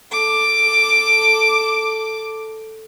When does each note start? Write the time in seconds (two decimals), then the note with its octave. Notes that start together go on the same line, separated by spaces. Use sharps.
0.11 A4 D6